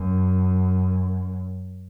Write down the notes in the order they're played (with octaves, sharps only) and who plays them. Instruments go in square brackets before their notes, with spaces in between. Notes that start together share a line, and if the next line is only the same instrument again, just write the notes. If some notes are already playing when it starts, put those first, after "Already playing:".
Already playing: [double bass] F#2